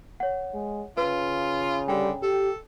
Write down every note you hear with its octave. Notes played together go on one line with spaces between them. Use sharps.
C#5 F#5
G#3
C#3 F4 B4
D3 G3 G5
G4 A4